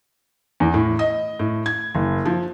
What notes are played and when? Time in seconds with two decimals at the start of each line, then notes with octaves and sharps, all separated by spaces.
0.60 E2
0.74 A2
0.99 D#5
1.39 A2
1.66 G#6
1.95 F#1
2.25 F3